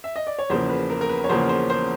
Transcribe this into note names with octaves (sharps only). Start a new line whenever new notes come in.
E5
D#5
D5
C#5
E2 C#3 F3 A#3 C5
B4
A#4
A#4
B4
C#5
E2 C#3 F3 A#3 C5
C5
C5